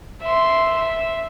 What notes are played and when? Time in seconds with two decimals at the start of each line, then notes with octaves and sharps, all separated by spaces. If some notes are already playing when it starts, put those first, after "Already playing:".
0.22 E5 C6
0.78 E5